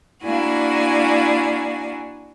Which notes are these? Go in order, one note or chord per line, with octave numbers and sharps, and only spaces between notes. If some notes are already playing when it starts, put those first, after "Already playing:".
A#3 D4 E4 F#4 G#5